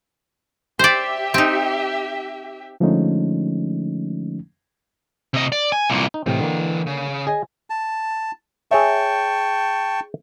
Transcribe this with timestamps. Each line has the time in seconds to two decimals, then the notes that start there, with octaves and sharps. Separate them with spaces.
0.79 G4 C5 D5 E5
1.34 C4 D#4
2.80 D3 F3 G#3 A3 C#4 D#4
5.34 C3 D#5
5.52 D5
5.72 G#5
5.90 C2 A#2
6.14 D#4
6.26 A2 C3 E3 G5
6.40 D3 A#3
6.86 C#3
7.27 G#4 D#5 G#5
7.70 A5
8.71 G#4 C#5 E5 G5 A5 C#6